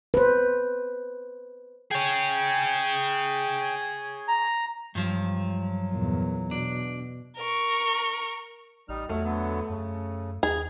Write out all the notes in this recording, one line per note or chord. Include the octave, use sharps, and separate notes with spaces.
B4 C5
G#4 C#5 G5
A#5
G2 F3 F#3
E2 A#2
B2 D4
A#4 C#6
A1 G3 D#4 F6
E2 F#3 A3 F6
D3 F#3 B3
F#2 C#3
D#2 G#4 F7